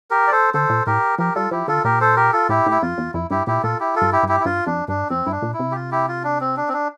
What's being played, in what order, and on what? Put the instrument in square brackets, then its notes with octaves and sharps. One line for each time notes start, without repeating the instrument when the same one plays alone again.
[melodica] G4 A#4
D5
A4 C5
[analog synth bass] D3 [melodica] A4 C5
[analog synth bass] A#2
[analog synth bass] A2 [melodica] G4 A#4
[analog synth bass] F3 [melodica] G4 A#4
[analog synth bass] G3 [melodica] F4 A4
[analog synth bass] F3 [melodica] E4 G4
[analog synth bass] D3 [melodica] F4 A4
[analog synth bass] A#2 [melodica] G4 A#4
[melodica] A4 C5
G4 A#4
F4 A4
[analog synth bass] A2 [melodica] E4 G4
[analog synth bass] A2 [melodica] E4
[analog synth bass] F2 [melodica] F4
[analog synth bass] E2
[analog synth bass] F2 [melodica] E4
[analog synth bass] G2 [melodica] E4 G4
[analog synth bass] A#2 [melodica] E4 G4
[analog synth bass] A#2 [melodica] F4 A4
[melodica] E4 G4
F4 A4
[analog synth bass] G2
[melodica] E4 G4
[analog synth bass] G2
[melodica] E4 G4
E4
[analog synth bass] G2 [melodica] F4
[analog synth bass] F2 [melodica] D4
[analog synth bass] G2 [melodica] D4
[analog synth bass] F2 [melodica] C4
[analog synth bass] G2 [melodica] E4
[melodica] D4
[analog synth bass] A#2
[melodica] E4
[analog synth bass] C3
[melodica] G4
F4
E4 G4
F4
D4
C4
D4
C4
D4